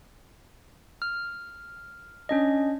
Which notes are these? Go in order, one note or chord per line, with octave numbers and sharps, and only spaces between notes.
F6
C#4 D4 D#5